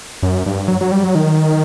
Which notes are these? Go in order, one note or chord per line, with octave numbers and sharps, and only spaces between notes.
F#2
G2
F#3
F#3
G3
F#3
D#3